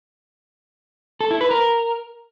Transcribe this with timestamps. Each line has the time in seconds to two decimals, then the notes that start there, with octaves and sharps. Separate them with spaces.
1.21 A4
1.31 E4
1.41 B4
1.51 A#4